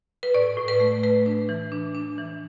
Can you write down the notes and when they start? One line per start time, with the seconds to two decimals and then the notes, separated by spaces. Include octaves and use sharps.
0.23 B4
0.34 A2 D5
0.57 A2
0.68 B4
0.80 A3
1.03 A3 B4
1.26 D4
1.49 E3
1.72 D4
1.95 D4
2.18 E3